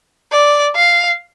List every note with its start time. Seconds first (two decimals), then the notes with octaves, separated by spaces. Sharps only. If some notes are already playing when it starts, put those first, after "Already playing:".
0.32 D5
0.76 F5